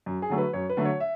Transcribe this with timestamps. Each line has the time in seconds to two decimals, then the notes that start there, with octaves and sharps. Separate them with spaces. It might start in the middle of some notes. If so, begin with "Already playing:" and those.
0.06 F#2
0.22 G#4
0.30 D3 F#3 A3
0.38 B4
0.53 F#2 C#5
0.69 B4
0.77 D3 F#3 A3
0.85 C#5
1.00 E5